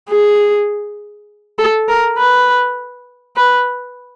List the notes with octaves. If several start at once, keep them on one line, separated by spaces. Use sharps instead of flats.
G#4
A4
A#4
B4
B4